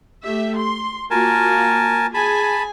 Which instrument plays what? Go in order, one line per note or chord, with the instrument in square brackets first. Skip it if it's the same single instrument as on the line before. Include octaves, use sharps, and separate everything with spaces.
[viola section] A3 G4 E5
C6
[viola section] A#3 F4 F#4 [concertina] A#4 G#5 A5
[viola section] G#4 G#5 [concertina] A5 B5